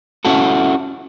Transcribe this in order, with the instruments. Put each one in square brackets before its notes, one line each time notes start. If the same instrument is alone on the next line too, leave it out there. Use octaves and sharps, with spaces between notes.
[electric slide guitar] C#4 E4 F#4 A4